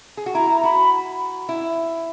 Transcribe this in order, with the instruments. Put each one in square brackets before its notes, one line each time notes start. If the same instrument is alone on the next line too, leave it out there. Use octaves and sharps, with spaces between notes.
[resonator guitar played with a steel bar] G#4
F#4
[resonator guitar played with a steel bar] E4 [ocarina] A#5
[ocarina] A#5
[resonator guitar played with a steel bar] F#4 [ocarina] B5
[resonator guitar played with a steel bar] E4